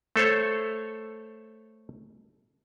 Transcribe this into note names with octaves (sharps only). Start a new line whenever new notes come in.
A3 A4 C5 C#5